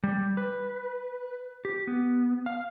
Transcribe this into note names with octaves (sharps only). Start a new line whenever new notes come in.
G3
B4
G4
B3
F5